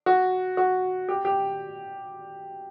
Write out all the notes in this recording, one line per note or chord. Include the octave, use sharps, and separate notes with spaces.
F#4
F#4
G4
G4